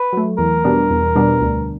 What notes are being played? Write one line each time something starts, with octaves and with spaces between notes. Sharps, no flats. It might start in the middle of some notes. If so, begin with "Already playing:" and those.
Already playing: B4
F#3 A3
E2 A#4
B2 G3 B3 D4
E2
B2 G3 B3 D4
D2